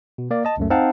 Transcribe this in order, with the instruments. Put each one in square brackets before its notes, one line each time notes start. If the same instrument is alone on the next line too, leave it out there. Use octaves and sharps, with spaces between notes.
[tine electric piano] B2
A#3 D5
D#5 A5
C#2 F#2 A3
C4 D#4 F5 F#5 A5